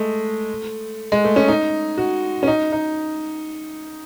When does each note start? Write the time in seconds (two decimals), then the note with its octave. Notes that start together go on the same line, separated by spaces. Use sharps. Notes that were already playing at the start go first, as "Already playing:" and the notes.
Already playing: G#3 A3
1.12 G#3
1.24 A3
1.36 C#4
1.48 D#4
1.98 F#4
2.43 C#4
2.47 D#4
2.72 D#4